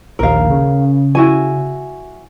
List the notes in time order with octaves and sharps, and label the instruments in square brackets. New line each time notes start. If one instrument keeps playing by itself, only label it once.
[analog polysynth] A#1 D#2 [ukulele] A#4 F5
[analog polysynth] C#3
[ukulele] E4 F#4 G#5